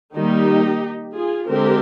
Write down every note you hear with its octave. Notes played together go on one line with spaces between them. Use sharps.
D#3 G3 A#3 D#4 G4
F4 G#4
D3 G#3 C4 G4 A#4